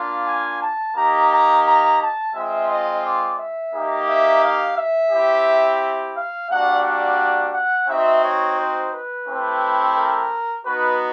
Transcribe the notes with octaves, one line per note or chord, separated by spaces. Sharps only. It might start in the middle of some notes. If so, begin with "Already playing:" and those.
Already playing: A#3 D4 F4
G#5
A5
A#3 D#4 G4 A#5
A#5
A#5
A5
G#3 C4 F4 E5
D#5
D5
E5
A#3 D#4 G4
E5
F5
E5
C4 E4 G4
F5
G3 A#3 D4 F#4 F#5
F#5
F#5
C4 D#4 F#4 E5
C#5
C5
B4
A3 C4 E4 G4
A#4
B3 D#4 F#4 B4